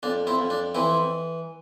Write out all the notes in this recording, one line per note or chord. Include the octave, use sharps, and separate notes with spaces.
F2 D4
C4 E4
F2
D4
E3 C4 E4